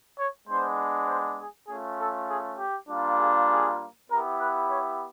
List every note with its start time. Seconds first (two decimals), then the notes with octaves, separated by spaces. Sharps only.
0.17 C#5
0.47 G#3 B3 D4 C5
1.08 C5
1.38 G#4
1.67 A3 C#4 F4 G#4
1.98 A4
2.28 G#4
2.58 G4
2.89 G3 A#3 D4 F4
3.19 G#4
3.48 G#4
4.09 B3 E4 G4 A#4
4.39 B4
4.69 C#5